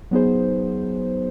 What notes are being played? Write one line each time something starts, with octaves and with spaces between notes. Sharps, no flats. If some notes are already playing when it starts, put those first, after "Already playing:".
F#3 B3 D#4 G#4 C5